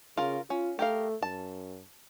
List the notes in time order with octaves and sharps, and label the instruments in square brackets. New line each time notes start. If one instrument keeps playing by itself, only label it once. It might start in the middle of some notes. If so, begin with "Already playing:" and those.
[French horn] C#3 [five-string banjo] F4 A#4
[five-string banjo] C#4 [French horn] F4
[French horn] A3 [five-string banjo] G4 A#4 F5
[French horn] F#2 [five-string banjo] A5